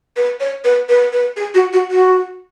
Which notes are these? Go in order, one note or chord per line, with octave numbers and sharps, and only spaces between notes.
B4
C#5
B4
B4
B4
G#4
F#4
F#4
F#4